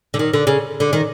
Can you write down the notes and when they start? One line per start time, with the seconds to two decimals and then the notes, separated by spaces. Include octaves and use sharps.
0.14 D3
0.19 D#3
0.33 D3
0.47 C#3
0.80 D3
0.93 D#3